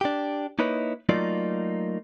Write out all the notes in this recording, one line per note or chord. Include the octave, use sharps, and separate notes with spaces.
D4 G4
A#3 D#4 E4 B4 C#5 D#5
F#3 A3 A#3 D#4 F4 D5